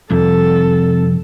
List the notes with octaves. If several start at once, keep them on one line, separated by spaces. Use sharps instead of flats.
C2 F2 A4